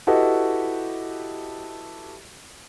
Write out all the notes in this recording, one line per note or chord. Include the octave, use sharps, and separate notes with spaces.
E4 F#4 G4 A4 B4 D#5